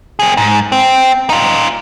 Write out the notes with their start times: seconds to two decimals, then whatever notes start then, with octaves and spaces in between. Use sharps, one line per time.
0.19 C4 G#4
0.37 G#2
0.72 C4
1.30 D#4 F4